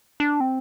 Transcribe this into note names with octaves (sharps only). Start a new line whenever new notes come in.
D4
C4